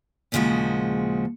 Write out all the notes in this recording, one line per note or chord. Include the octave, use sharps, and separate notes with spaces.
D#2 A#2 C#3 F3 G#3 F#4